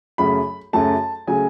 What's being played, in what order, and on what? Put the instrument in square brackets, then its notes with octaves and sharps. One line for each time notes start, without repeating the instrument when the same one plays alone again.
[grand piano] F#2 C#3 F#3 A3 B5
F#2 C#3 F#3 A3 A5
C#3 F#3 A3 G#5